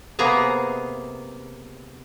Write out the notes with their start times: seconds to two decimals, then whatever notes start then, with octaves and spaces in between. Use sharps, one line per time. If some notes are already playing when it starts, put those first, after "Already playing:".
0.19 C3 A#3 B3 G#4 A#5